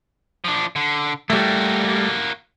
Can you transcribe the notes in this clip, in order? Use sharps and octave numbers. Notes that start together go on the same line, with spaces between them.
F3 D4
D3
G3 A3 A#3 F#4